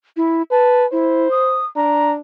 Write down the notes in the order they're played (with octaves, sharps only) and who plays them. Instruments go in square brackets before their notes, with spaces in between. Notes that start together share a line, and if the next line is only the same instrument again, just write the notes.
[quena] E4
[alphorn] B4 [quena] A5
[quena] E4 [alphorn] C5
[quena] D#6
[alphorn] D4 [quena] A#5